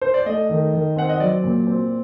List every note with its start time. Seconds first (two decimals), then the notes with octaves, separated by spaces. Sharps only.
0.02 C5
0.14 D5
0.26 A3 D#5
0.50 D#3
0.73 D#3
0.96 C4 F#5
1.09 D#5
1.20 F#3 D5
1.44 A#2
1.67 C4